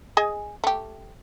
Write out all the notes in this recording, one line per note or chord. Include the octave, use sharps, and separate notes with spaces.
G#4 D#5 G#5
A3 G4